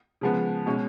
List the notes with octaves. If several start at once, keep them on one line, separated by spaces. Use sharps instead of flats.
C#3 F3 G#3 B3
B2 G#3 C#4